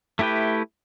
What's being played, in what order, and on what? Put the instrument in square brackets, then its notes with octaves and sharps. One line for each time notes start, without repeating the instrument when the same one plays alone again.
[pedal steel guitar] A3 E4 G4 B4 G5